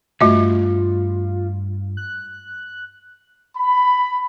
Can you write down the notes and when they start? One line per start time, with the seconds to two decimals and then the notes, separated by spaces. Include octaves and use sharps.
0.21 C#2 G2 A3 F4 F#4 E5
1.97 F#6
3.57 B5